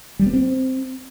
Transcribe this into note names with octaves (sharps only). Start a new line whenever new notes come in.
G3
B3
C4